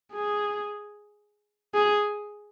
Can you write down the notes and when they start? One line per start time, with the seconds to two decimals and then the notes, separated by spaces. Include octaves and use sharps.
0.12 G#4
1.74 G#4